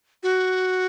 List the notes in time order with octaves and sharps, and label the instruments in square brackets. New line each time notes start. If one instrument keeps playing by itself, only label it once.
[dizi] F#4